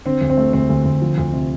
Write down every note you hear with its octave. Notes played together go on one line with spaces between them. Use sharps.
D3 C4
D2
C4
A3
D2 C4
D2
D2
F3
D2
C3